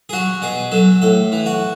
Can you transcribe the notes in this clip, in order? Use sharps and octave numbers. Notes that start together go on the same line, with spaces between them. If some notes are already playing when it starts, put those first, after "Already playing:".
G#4
F#3 F#4
B2 G#4
F#3 A4
A2 A4
E3
F#4